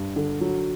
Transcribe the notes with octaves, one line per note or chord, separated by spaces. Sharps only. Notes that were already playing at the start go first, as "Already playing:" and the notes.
Already playing: G2
D3
F#3